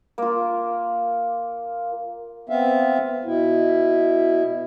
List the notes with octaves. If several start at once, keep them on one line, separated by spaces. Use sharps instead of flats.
A#3 F4
B3 C4 E5 F5
B2 E4